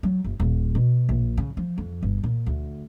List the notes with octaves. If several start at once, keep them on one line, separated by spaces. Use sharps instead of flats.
F#3
F#1
D#1
B2
A#1
C#3
F3
F2
G1
A#2
D2